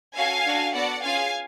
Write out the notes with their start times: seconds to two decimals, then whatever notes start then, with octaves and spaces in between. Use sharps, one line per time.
0.17 C#4 F#4 A4 F5 G#5
0.46 D4 F#4 A4
0.74 B3 F#4 A4 D5 F#5
1.03 C#4 F4 G#4 F5 G#5